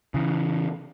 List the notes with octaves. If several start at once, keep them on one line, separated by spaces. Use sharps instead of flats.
C#3 E3